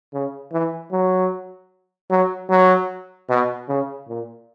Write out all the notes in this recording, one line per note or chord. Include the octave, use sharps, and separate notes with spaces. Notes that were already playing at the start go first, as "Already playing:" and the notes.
C#3
E3
F#3
F#3
F#3
B2
C#3
A#2